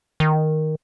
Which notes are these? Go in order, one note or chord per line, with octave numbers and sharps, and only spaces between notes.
D#3